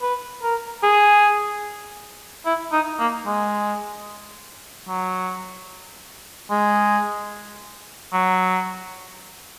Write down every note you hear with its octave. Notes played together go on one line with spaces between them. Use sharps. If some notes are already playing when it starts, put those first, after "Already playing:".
B4
A#4
G#4
E4
D#4
A#3
G#3
F#3
G#3
F#3